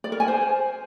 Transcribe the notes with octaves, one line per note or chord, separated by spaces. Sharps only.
D5
A#4
G#5
C5